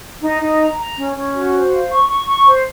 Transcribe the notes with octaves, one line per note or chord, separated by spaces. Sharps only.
D#4
D#4
A#5
A#5
C#4
C#4
F#4
C5
F5
C#6
C#6
C#6
C5